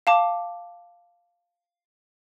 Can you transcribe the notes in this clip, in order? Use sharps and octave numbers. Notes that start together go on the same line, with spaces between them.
F5 A5 D6